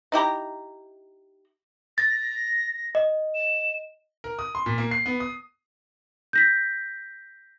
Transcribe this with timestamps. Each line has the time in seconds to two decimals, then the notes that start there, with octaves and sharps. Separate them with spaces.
0.12 D#4 E4 G4 A#5
1.98 A6 A#6
2.95 D#5
3.35 E7
4.24 A#4
4.39 D#6
4.55 C6
4.66 A#2
4.78 A#3
4.91 C7
5.06 B3
5.20 D#6
6.33 G6 A#6 B6